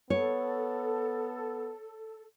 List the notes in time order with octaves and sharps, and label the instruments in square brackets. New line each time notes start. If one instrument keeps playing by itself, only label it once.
[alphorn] B3 [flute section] A4 [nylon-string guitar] C#5